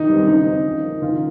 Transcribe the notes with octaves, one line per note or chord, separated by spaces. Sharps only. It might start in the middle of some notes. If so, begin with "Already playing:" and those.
Already playing: D#3 D#4
G3 C4
C#3 D#4
F3 C4
C#3
F3 A#3
D#3 F4